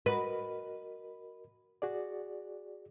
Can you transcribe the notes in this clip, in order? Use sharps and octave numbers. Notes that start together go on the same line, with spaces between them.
F#4 A#4 B4 D#5
F#4 G#4 D5